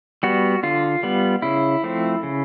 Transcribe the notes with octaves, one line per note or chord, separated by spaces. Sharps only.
G3 B3 F#4
D3 F4
G3 B3
C#3 E4
F3 A3 C4
C#3